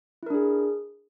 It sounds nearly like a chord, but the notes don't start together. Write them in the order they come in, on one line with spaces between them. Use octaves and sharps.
E4 A#4 D4 G#4